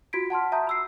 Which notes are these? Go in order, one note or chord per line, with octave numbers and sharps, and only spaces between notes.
F4 F#4 G#6 B6 D7
F#5 A5 C6 F6
E5 A5 A#5 D#6 G6
B5 E6 C7